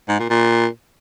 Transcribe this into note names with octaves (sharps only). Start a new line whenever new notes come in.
G#2
A#2
A#2